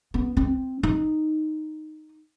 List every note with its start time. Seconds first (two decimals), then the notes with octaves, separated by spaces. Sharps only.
0.14 B3
0.37 C4
0.83 D#4